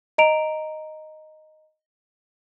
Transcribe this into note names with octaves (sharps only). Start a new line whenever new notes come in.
D#5 A#5 D7 F7